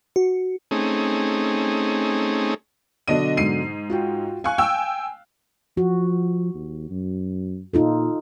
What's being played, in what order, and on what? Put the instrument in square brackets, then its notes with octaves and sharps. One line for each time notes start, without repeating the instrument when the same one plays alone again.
[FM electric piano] F#4
[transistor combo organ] A3 C4 C#4 D#4 G#4
[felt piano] B2 D3 F#3 [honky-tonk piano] D4 D#5 D#7
[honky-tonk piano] G#2 C7 D#7
[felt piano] F4 F#4 G5
[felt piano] F5 F#6 [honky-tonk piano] G#5 C#6
[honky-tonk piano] G5 G#5 E6
[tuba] F3 [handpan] F#4
[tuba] D#2
F#2
[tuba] A#2 [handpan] D#4 F4 A4